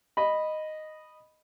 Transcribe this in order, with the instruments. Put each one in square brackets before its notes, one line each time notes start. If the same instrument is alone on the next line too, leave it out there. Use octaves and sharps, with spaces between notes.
[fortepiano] D#5 B5